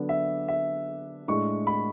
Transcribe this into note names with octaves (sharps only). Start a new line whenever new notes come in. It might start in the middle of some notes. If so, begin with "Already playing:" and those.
Already playing: D3 F#3 B3 D4
E5
E5
A2 G#3 D4 C#6
B5